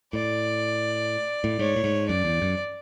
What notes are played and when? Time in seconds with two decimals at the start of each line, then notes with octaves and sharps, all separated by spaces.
0.13 A2 D5
1.44 A2
1.59 G#2 C#5
1.76 A2
1.84 G#2
2.08 F#2 D5
2.25 E2
2.42 F#2